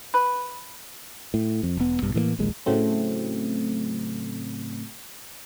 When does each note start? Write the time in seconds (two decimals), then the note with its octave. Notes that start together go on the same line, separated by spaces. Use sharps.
0.14 B4
1.34 A2
1.63 F2
1.77 E1 B3
2.02 A#1 G2 B2
2.14 A2 E3 G#3 A#3
2.39 D1 A#1 D#2 G#3
2.66 A2 C#3 F#3 A3 C4